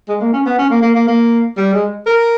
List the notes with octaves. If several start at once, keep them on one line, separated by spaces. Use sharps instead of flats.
G#3
A#3
C#4
B3
C#4
A#3
A#3
A#3
A#3
G3
G#3
A#4